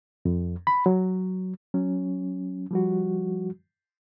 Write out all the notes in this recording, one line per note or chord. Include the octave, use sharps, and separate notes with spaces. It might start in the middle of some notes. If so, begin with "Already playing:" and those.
F2
B5
F#3
F#3 C#4
F3 G3 F#4